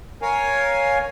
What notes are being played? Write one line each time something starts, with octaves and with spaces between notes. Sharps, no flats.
A#4 C#5 F5 G#5